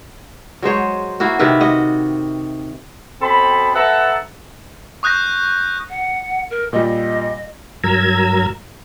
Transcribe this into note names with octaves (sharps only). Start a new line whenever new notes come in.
F#3 G#3 C5 C#5
A#3 E4 F#4
C3 D#3 E4 B4
F#4 D#5 F#5
B2 C4 A4 B5
A4 B4 E5 F#5 A5 A#5
C#6 D#6 F#6 G6 A#6
F#5
A#4
A#2 G3 D#5
G2 F#3 A#4 A#5 E6 G#6